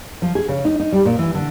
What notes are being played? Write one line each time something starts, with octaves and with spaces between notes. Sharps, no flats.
F3
G#4
C#3
D#4
D#4
G3
A#2
E3
D3